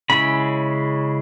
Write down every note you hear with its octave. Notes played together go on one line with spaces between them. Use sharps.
C#3 G#3 C#4 E4 B5